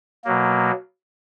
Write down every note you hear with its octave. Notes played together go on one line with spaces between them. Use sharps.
B2 F#3 A#3